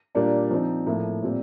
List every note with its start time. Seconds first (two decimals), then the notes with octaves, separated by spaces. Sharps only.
0.15 A#2 G3 A#3 D4
0.51 F3 C4 D#4
0.87 A2 F3 A#3
1.23 A#2 G3 C4